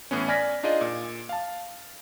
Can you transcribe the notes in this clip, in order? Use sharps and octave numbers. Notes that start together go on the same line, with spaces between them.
A2 E3 B3 C#4
D5 G#5 F6 G#6 A#6 B6
D4 D#4 F4 G#4 D5 D#5
A#2
F5 A5